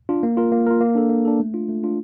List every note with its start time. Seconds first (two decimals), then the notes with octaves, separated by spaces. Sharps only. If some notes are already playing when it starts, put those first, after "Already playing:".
0.09 D4 F4
0.23 A#3
0.37 F4 A#4
0.52 A#3
0.67 F4 A#4
0.81 A#3
0.95 D4 A4
1.10 A#3
1.25 D4 A4
1.40 A3
1.54 D4 F4
1.69 A3
1.83 D4 F4